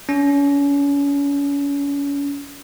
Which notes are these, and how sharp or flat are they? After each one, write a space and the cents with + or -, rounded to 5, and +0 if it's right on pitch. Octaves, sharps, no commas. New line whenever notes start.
C#4 +35